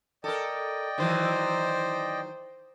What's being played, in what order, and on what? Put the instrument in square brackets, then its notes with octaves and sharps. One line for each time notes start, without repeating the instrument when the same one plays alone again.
[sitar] A4 A#4 [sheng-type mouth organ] D5 D#5 G5
[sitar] D#3 E3 F#3 [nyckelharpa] C5